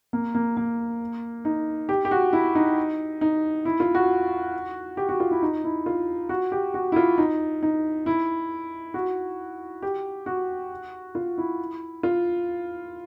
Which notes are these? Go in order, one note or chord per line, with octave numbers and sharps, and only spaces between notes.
A#3
A#3
A#3
D#4
G4
G4
F#4
E4
D#4
D#4
E4
F4
F#4
G4
F#4
F4
E4
D#4
E4
F4
F#4
G4
F#4
E4
F4
D#4
D#4
E4
F#4
G4
F#4
F4
E4
F4